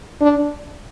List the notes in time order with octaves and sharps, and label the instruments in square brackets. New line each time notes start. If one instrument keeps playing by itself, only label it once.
[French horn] D4